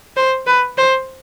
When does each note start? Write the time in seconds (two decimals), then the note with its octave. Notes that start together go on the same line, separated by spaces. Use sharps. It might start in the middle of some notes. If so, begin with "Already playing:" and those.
0.17 C5
0.47 B4
0.78 C5